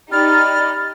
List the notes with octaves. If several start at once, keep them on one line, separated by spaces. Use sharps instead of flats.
D#4 G4 D5 B5 F6 A6